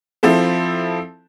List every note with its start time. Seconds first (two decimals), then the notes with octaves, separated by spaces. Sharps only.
0.23 F3 C4 E4 A4